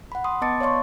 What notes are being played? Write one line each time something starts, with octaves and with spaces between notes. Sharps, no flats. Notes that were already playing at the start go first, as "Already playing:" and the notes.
F#5 B5
B5 C6 D#6
B3 D#5 A5 D6 A6 C#7
C#5 D5 F5 C6 C#6